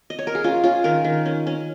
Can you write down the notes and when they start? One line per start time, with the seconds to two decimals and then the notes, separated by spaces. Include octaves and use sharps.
0.10 D#5
0.19 C#5
0.27 A#4
0.35 G#4
0.44 C#4 F4
0.64 C#4 F4
0.84 D#3 A#4
1.04 D#3
1.26 C#4
1.47 C#4